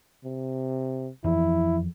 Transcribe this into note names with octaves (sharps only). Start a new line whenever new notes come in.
C3
F2 E3 F3 E4